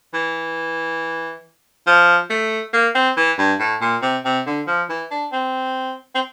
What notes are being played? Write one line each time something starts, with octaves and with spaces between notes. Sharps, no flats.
E3
F3
A3
A#3
C4
E3
G2
A2
A#2
C3
C3
D3
F3
E3
D4
C4
C4